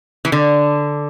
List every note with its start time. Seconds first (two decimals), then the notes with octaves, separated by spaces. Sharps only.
0.25 E3
0.32 D3